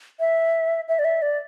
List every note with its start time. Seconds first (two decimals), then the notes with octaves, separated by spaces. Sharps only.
0.20 E5
0.88 E5
0.99 D5
1.05 E5
1.22 D5